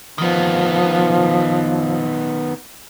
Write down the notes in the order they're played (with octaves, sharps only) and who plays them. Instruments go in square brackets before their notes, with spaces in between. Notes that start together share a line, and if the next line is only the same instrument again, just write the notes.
[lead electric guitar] D#3 B3 [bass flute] F3